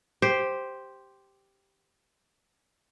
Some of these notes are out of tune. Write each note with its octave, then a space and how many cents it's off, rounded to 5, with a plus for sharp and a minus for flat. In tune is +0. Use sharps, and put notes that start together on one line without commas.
G4 +0 C5 +0